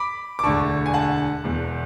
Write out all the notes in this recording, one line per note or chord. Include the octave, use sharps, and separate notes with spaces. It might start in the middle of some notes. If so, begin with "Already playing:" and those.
Already playing: B5 D6
D6
E1 D2 D3 A5 C#6
G#5
F#5 A5
E1 E2 B2